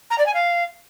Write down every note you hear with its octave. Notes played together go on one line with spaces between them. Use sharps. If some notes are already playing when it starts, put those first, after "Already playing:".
A#5
D5
G#5
F5